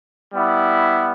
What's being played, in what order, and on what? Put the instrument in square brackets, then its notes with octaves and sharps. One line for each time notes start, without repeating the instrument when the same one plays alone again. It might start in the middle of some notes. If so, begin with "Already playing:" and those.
[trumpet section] G3 B3 E4